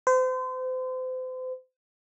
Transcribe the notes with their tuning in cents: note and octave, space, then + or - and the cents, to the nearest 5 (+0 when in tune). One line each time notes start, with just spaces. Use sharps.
C5 -35